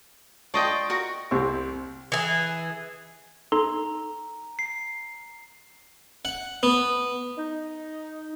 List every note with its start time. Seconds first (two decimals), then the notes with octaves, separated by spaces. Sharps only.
0.54 F4 D5 D#5 G5 A5 C#6
0.90 F#4 A#4 C#6
1.31 C2 C4 C#6
2.12 E3 G#4
3.52 D#4 A4 A#5 C6
4.59 C7
6.25 F#5
6.63 B3
7.38 D#4